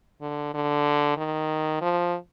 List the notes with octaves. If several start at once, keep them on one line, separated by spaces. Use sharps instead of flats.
D3
D3
D#3
F3